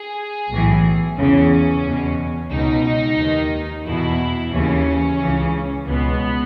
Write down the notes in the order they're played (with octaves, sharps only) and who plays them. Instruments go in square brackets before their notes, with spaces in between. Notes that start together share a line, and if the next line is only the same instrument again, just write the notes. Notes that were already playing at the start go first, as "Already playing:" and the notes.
Already playing: [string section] G#4
B1 A2 E3
E2 C#3 E3 C#4
E2 B2
C#2 B2 D#4
D#2 D#3
E2 B2 E4
D#2 C#3 E3 C#4
C#2 C#3 E3
C#2 B2 B3